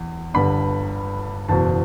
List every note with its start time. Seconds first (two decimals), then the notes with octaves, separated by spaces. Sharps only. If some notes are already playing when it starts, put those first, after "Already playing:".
Already playing: E2
0.34 G1 G2 D3 B5
1.49 F#1 E2 B2 A5